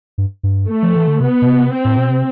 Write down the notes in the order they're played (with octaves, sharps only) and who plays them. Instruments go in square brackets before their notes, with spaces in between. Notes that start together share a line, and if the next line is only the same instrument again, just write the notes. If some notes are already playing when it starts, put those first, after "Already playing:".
[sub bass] G2
G2
[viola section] A3
[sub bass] F3
E3
D3
[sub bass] C3 [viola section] B3
[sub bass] B2
C3
[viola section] C4
[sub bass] A2
B2
C3